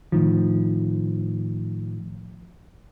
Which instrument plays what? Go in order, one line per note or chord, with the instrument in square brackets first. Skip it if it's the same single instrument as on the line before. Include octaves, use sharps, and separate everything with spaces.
[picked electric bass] A2 D#3 F3